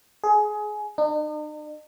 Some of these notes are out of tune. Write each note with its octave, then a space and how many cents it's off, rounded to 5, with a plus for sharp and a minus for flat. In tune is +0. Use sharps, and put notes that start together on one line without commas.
G#4 +20
D#4 -45